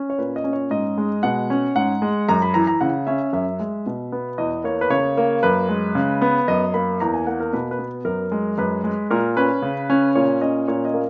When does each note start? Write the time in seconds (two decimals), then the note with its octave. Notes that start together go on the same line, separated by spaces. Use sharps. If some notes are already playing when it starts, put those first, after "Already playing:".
Already playing: C#4
0.10 C#5
0.18 A#2 B4
0.36 D#5
0.44 C#4
0.53 C#5
0.70 G#2 D#5
0.98 G#3
1.23 B2 F#5
1.50 C#4
1.76 G#2 F#5
2.02 G#3
2.29 F#2 A#5
2.42 B5
2.54 E3 A#5
2.67 A#5
2.81 C#3 F#5
3.07 C#4 E5
3.33 F#2 E5
3.59 G#3
3.86 B2
4.12 B3
4.38 E2 D#5
4.64 A#3 C#5
4.81 B4
4.90 C#3 C#5
5.17 A#3
5.43 F#2 B4
5.69 G#3
5.95 C#3
6.21 B3
6.48 F#2 D#5
6.74 A#3 B5
7.00 E2 A#5
7.14 G#5
7.27 A#3 F#5
7.40 A#4
7.53 B2 B4
7.71 B4
7.79 B3
8.05 F#2 A#4
8.32 G#3
8.58 F#2 B4
8.84 G#3
9.11 A#2 A#4
9.37 C#4 B4
9.62 C#3
9.90 C#4
10.15 A#2 C#5
10.41 C#4 D#5
10.68 A#2 C#5
10.85 D#5
10.94 A#3